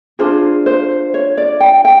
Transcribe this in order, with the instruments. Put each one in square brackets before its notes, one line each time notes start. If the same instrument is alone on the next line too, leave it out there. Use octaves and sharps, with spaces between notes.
[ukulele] D4 F4 G#4 C5
C5
C#5
D5
G5
G5